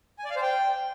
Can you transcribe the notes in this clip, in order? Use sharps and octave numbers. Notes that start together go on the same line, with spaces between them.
G#5
D5
F5
C5
G5